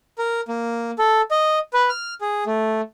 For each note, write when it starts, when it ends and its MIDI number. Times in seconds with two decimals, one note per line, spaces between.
0.18 0.41 70
0.48 0.91 58
0.99 1.21 69
1.31 1.59 75
1.73 1.89 71
1.89 2.14 89
2.21 2.44 68
2.46 2.81 57